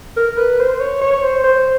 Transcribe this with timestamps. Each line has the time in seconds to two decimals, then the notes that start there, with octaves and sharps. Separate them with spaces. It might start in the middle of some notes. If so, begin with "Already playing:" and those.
0.16 A#4
0.37 B4
0.59 C5
0.80 C#5
1.01 C#5
1.23 C5
1.44 C5